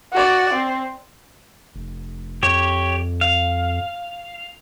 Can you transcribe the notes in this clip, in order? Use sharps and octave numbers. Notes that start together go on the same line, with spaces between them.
F#4 D5
C4
F1
F2 G4 C#5
F5